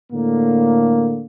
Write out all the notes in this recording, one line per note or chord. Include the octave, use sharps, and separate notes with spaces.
A2 D3 A#3